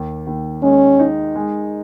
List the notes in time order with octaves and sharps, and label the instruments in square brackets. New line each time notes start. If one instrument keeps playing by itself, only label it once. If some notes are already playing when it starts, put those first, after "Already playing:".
Already playing: [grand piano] D#2
D#2
[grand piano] G#3 [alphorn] C#4
[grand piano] D#4
G#3